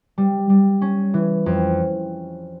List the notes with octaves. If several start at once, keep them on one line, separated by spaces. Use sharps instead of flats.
G3
G3
C#4
E3
F2